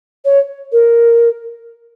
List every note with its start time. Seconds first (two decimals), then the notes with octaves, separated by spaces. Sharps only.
0.25 C#5
0.72 A#4